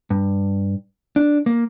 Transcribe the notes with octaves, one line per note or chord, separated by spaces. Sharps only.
G2
D4
A#3